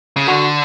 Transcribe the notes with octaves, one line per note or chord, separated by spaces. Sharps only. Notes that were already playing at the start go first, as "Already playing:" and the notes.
C#3
D3 F#4